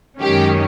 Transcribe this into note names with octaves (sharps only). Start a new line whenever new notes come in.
F#2 D#3 G#3 C#4 G4